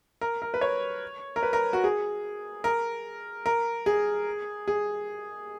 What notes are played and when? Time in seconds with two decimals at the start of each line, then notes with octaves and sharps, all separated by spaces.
0.21 A#4
0.42 A#4
0.54 B4
0.61 C#5
1.36 A#4
1.43 B4
1.53 A#4
1.73 F#4
1.84 G#4
2.64 A#4
3.46 A#4
3.86 G#4
4.68 G#4